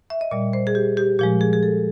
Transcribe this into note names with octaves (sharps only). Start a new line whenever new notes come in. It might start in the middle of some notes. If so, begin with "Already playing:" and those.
E5
D#5
A#2 G3 D5
C5
G#4
G4
G4
A#2 F3 G#3 G4
G#4
G#4
A4